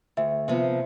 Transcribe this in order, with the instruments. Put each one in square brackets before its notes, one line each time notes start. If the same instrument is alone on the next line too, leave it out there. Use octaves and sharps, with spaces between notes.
[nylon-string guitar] D2 [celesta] E5
[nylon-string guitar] C3 F3 B3 [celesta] E5